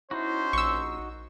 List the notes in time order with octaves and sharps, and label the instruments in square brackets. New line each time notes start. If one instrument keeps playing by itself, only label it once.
[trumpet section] C#4 C5 [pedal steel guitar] D#4 F#4 [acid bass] E4
[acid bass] A#1 [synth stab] C#6 E6